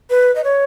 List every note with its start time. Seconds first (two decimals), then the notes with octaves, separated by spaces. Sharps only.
0.10 B4
0.36 D#5
0.44 C#5